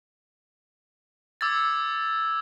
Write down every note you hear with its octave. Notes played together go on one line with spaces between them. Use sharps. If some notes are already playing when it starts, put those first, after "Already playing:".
D6 E6 G#6 A6